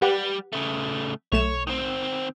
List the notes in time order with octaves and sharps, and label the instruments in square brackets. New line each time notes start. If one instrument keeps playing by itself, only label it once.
[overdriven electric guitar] G3 [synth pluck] G4 B4 F#5
[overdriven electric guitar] C#3 A3
[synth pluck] B1 A3 E7 [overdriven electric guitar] C#5
[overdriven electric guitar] D#3 C4